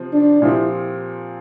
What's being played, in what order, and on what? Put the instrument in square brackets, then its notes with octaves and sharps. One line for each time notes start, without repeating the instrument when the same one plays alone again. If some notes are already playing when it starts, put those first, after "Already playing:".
Already playing: [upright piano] C3 F3 C4
[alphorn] D4
[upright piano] A#2 F3 C4 G4 [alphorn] E4